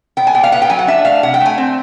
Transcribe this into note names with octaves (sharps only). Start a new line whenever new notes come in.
B3 G5
G#5
A#2 G5
F5
B3 F#5
G5
F#3 G#5
F#5
D4 E5
A3 F5
C3 F#5
G5
A3
G#5
C4